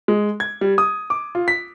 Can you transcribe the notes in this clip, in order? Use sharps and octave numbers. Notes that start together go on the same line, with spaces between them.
G#3
G#6
G3
D#6
D6
F4
B6